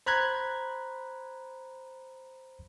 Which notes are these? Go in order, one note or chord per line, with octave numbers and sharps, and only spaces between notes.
C5 A#5 B5 F#6 G#6